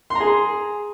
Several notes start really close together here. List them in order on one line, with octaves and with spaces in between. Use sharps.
C6 A#5 G#4